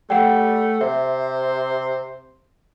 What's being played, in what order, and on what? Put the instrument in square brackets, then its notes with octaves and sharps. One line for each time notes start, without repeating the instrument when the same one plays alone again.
[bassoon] G3 [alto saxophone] A3 [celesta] F#5 G5
[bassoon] C3 [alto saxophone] C5 [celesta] E5